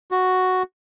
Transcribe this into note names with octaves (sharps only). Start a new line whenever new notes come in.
F#4